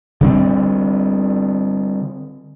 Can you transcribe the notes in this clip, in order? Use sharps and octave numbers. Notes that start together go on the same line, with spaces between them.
D3 G3 C4